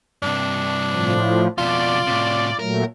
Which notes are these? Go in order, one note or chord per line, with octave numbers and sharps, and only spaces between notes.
G2 C3 D4
A2 F3
F2 B2 F4 D5
A2 C3
A#2 F#3 A3 A#4